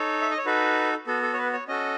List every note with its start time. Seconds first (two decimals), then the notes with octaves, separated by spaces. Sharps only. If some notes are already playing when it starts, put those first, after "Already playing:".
Already playing: D#4 A4 C#5
0.22 E5
0.30 D#5
0.38 C#5
0.46 D#4 F#4 A4 B4
1.07 B3 F#4 A4
1.22 A4
1.33 C#5
1.37 B4
1.53 C#5
1.68 C#4 F#4 A4 D#5